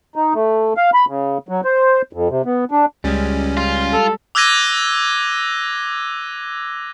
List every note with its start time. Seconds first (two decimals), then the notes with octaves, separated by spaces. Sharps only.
0.16 D#4
0.34 A3
0.77 F5
0.94 B5
1.08 C#3
1.49 F#3
1.65 C5
2.13 F2
2.30 C3
2.45 B3
2.71 D4
3.04 C#2 G3 G#3 C#4
3.57 F4
3.93 A4
4.35 D6 E6 F#6 G#6 A#6 D#7